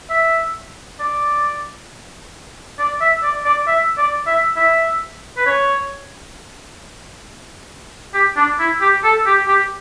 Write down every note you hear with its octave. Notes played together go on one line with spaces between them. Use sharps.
E5
D5
D5
E5
D5
D5
E5
D5
E5
E5
B4
C#5
G4
D4
E4
G4
A4
G4
G4